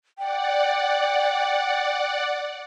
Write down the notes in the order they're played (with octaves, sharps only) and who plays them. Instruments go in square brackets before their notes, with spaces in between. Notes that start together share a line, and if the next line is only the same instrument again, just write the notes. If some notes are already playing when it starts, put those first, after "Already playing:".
[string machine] D5 F#5 [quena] G5